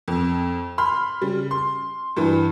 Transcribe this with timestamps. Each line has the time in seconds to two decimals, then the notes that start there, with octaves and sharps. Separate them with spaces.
0.08 F2
0.78 B5 C6 F6
1.21 C#3 G3
1.51 C6
2.17 G2 E3